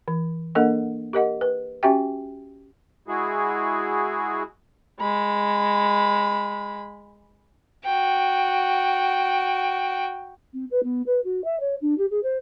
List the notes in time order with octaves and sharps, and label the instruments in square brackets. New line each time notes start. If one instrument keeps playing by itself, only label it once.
[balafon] E3
A#3 D4 A4 A#4 D#5 F#5
G4 A#4 D#5 F#5
B4
C#4 F#4 G4 E5 G5
[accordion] G#3 E4 F#4 G#4
[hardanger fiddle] G#3 B5
[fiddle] F#4 G5
[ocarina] C4
B4
B3
B4
F#4
E5
C#5
D4
G4
G#4
C5